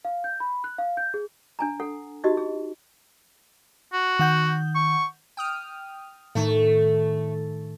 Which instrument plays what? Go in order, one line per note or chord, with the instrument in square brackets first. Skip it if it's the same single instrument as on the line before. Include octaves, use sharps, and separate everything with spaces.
[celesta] F5
G6
B5
F#6
F5
G6
G#4
[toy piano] D4 G#5 A#5
A4 F#5
D#4 E4 F#4 G4 D#5
G#4
[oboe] F#4
[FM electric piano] D#3 F#5 G6
[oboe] C#6
[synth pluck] G5 D#6 F6
[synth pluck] A2 D#3 [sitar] A3